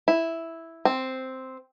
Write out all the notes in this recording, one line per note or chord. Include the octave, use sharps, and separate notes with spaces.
E4
C4